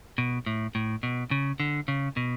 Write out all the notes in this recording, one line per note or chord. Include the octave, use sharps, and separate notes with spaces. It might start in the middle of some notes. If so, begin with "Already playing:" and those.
B2
A2
A2
B2
C#3
D3
C#3
B2